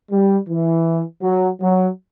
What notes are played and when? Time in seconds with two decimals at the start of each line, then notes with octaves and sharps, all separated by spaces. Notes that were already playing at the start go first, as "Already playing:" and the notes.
0.11 G3
0.49 E3
1.22 F#3
1.61 F#3